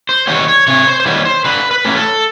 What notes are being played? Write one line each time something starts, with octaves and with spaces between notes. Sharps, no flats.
C5
D#3 G3 B3 C#5
C#5
C3 C#5
C5
C5
D#3 G3 B3 C#5
C5
D3 B4
B4
F#3 A3 C#4
A4